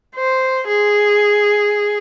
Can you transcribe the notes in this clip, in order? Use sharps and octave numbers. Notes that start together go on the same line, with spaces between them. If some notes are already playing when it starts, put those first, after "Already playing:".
C5
G#4